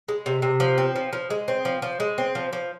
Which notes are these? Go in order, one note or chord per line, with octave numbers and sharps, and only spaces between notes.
G#3
C3
C3
F3
C4
F3
F3
G#3
C4
F3
F3
G#3
C4
F3
F3